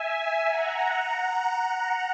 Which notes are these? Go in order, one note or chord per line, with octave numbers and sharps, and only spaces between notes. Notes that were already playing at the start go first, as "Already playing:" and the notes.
Already playing: E5 G#5
F#5 A#5